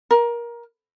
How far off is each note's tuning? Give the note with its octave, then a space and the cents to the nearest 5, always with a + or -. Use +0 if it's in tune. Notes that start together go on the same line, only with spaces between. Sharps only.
A#4 +20